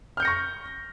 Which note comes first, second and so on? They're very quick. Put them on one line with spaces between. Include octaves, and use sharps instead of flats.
F6 G6 C#7 A#6 C#6